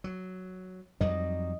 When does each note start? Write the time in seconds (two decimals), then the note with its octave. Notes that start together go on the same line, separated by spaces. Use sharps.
0.04 F#3
1.01 F2 F#3 G3 D#5